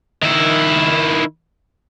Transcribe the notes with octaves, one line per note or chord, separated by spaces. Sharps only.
D#3 E4